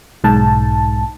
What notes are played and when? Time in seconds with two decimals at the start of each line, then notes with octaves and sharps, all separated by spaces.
0.24 B1 G#2 A5